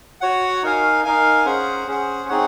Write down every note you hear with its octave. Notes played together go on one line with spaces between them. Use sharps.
F#4 C#5 F#5
D#4 A#4 F5 G#5
D#4 A#4 F5 G#5
C#4 G#4 C5 F#5
C#4 G#4 C5 F#5
C4 D#4 G#4 C#5 F#5